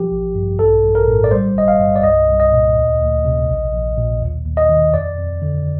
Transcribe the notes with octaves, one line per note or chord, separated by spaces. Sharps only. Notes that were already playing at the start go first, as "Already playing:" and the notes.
Already playing: F3 G4
A1
G2
A#1 A4
A#1
A#4
A2
D5
G3 C5
G1 D#5
F5
G2
D5
C2 D#5
C2
D#5
A#2
D2
D2
C3
A#1
A#1
A#2
D#2
D#2
D#5
D#3
F2 D5
F2
D3